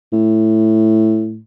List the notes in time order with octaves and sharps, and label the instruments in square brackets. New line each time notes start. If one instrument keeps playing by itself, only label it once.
[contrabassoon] A2